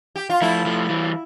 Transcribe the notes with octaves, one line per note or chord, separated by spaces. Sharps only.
G4
F4
F3 A3 E4
F3 A3
E3 G3